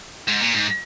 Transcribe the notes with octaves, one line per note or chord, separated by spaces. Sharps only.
G#2
A#2
G#2